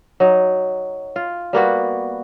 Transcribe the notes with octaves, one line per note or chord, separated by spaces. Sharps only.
F#3 D#4
F4
G3 A#3 B3 F#4